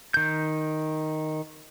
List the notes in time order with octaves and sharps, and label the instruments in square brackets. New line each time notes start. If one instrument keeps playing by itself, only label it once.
[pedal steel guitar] D#3 G6